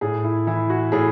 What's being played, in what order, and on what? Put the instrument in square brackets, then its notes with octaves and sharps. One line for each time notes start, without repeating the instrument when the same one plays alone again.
[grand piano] A2 G#4
E4
E3 E4
F#4
A2 G#4